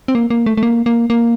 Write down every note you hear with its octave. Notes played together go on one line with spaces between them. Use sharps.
C4
A#3
A#3
A3
A3
A#3
A#3
A#3